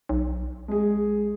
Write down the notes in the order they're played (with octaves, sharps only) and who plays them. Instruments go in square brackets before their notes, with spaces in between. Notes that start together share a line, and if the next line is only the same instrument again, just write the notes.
[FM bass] B1
[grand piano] G#3 G#4